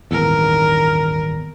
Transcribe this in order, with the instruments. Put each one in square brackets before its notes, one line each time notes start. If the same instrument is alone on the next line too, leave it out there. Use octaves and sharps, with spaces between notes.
[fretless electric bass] D#1 G#1 E2 [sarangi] A#4